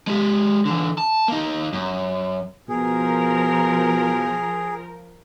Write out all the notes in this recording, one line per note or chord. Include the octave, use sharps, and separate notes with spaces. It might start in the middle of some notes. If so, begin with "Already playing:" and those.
G#3 G4
D3 E3
A5
A#3 D#4
F#2
B2 F3 G#4 A#4